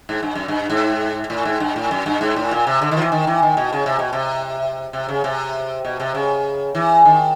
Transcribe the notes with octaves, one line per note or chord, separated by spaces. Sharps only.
G#2
G2
F#2
G2
G#2
A2
G#2
G2
A2
F#2
G2
G#2
A2
A#2
C3
D3
D#3
F3
E3
D#3
E3
D#3
B2
C#3
C3
B2
C3
C3
C#3
C3
B2
C3
C#3
E3
D#3